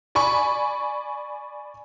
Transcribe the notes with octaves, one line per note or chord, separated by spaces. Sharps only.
D5 G#5 B5 C#6